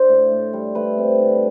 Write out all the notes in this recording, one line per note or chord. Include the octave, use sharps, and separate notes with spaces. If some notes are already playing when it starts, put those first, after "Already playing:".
Already playing: D4 C5
A2
A2
G3
A3 B4
C4
D3